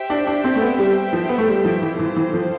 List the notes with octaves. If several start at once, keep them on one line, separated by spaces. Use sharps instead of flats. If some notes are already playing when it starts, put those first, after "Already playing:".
Already playing: G4 C5 E5 G5
D4
D4
C4
A3
B3
G3
F3
B3
A3
G3
F3
E3
E3 C4 F4 A4 C5
E3
F3